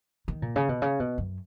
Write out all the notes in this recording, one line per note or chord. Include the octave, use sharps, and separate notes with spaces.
D#3
A#2
C#3
B2
C#3
B2
F#2